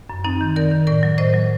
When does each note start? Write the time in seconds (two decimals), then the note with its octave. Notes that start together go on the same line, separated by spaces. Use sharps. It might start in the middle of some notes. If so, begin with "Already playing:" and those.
0.10 F#2
0.24 F#2 C4 D#4
0.41 D#3
0.56 D#3 A#4 D5
0.71 D#3
0.87 A2 A#4 D5
1.03 F#3
1.18 A2 C5 D#5
1.33 F#3